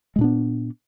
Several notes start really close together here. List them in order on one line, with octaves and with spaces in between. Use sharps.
G#3 A#2 D4 B3